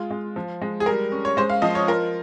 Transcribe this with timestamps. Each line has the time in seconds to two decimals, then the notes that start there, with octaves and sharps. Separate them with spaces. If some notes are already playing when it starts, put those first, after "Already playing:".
Already playing: G#3 F4
0.11 G#3
0.36 F3
0.62 G#3
0.80 G#4
0.86 G3 A#4
1.12 C#4
1.25 C#5
1.37 G#3 C5
1.50 F5
1.62 F3 D#5
1.75 C#5
1.87 F4 A#4